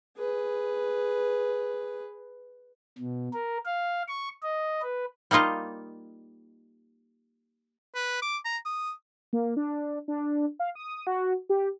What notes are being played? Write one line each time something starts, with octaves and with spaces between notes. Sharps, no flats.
G#4 B4
B2
A#4
F5
C#6
D#5
B4
G3 A#3 D#4 F4 D#5
B4
D6
A#5
D#6
A#3
D4
D4
F5
D#6
F#4
G4